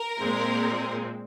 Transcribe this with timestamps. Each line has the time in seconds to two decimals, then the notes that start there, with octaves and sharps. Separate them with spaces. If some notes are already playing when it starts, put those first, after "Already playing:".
Already playing: A#4
0.19 A#2 G#3 C4